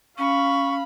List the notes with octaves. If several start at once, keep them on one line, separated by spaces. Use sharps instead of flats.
C#4 F5 B5 C#6